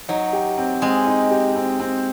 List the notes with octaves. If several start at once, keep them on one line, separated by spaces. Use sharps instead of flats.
F#3 D#4
G4
C4
G#3 C4
D#4
G4
C4
C4